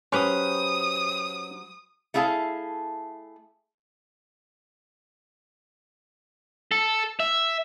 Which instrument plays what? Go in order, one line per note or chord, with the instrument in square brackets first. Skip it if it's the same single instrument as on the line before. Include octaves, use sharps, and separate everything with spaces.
[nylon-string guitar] F#3 G4 C5 [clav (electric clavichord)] C#4 B4 [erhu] D#6
[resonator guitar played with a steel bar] A3 E4 G#4 F5 A5
[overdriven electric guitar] A4
E5